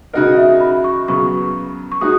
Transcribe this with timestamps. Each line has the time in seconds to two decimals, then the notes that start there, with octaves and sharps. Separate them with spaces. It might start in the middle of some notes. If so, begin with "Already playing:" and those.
0.13 C#3 G#3 D#4 F#4 A#4 D#5
0.37 E5
0.61 B5
0.84 C#6
1.08 C#3 F#3 B3 C#6
1.92 C#6
2.01 G#3 D#4 F#4 D#6